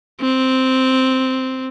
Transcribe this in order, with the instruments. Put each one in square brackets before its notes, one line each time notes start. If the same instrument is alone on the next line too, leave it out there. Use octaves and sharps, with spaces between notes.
[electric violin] C4